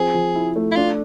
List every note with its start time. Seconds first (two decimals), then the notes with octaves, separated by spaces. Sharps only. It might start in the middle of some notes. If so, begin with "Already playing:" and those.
Already playing: F3 C4 G#4
0.14 F3
0.35 E4
0.56 A3
0.72 E4
0.76 D4 F4